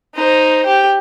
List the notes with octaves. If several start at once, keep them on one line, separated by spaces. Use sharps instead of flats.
D#4 C5
G4